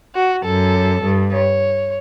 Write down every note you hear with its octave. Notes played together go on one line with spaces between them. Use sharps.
F#4
F#2 A4
G2
C#5